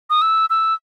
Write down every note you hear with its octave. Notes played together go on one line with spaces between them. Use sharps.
D#6
E6
E6